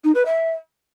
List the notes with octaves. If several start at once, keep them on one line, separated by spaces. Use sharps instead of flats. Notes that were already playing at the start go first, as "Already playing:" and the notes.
D#4
B4
E5